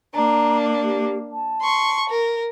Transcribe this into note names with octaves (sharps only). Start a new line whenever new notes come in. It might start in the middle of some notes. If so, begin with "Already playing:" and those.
A#3 D4 A#5
G4
A5
C6 C#6
A#4